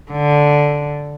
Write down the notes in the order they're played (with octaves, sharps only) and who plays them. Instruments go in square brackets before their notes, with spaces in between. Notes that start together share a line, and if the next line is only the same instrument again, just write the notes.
[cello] D3